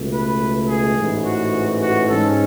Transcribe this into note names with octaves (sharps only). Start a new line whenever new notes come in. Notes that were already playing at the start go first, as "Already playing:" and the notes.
Already playing: C#2 B2 A3
B4
G#4
A1 G#2 E3
F#4
F#4
G#2 G#3 C#4 A4